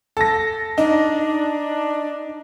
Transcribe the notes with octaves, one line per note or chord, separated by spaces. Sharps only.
A4 A#6
D4 D#4